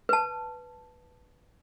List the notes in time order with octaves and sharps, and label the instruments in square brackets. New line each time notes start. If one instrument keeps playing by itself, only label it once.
[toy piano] B4 A5